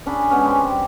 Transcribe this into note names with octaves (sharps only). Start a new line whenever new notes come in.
C#4 D4 G#4 B5
G#3 B3 C#4
C4 G4 C6
G3